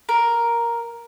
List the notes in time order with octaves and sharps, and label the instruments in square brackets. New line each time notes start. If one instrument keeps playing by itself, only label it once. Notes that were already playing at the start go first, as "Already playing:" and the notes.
[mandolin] A#4